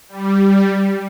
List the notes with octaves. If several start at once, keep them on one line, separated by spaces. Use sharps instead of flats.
G3